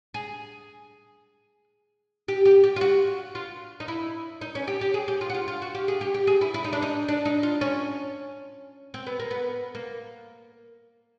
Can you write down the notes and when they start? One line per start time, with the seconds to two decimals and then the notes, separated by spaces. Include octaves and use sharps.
0.14 G#4
2.28 G4
2.45 G4
2.64 G4
2.76 F4
2.81 F#4
3.35 F4
3.80 D#4
3.88 E4
4.41 D#4
4.55 C#4
4.68 G4
4.81 G4
4.94 G#4
5.08 G4
5.21 F4
5.30 F#4
5.35 F4
5.48 F4
5.62 F#4
5.75 G4
5.88 G#4
6.01 G4
6.14 G4
6.27 G#4
6.41 E4
6.54 E4
6.64 D#4
6.73 D4
6.82 D#4
7.09 D4
7.25 D#4
7.43 F4
7.61 C#4
8.94 C4
9.07 B3
9.20 A#3
9.31 B3
9.75 A#3